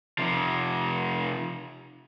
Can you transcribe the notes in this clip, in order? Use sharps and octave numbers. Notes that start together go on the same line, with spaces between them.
C3 F3